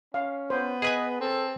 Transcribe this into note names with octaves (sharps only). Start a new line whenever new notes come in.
C#4 F5
B3 C5
G#4 B4 D#5 G#5
C4 A4